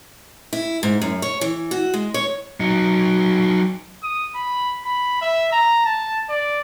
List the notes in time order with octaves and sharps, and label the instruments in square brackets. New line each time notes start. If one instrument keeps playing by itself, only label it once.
[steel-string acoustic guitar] E4
G#2
F#2
C#5
E3
F#4
G#3
C#5
[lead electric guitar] F#3 D#4
[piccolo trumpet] D#6
B5
B5
E5
A#5
A5
D5